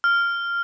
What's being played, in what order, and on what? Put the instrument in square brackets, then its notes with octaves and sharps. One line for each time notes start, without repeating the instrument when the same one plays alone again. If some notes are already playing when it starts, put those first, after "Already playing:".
[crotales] F6